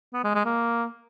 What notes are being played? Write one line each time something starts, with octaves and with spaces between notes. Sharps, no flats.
B3
G#3
G#3
A#3